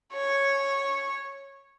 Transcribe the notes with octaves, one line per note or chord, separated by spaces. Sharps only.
C#5